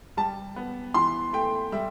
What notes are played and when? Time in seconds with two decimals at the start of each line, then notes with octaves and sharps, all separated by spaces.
0.17 G3 A5
0.56 B3
0.94 E3 C6
1.33 A3 G5
1.72 G3 E5